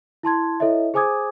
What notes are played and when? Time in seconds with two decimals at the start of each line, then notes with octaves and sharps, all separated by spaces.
0.23 E4 A5 C6 G#6
0.60 E4 A4 C#5 D#5 E5
0.94 G#4 C5 G#5 D6 D#6 G#6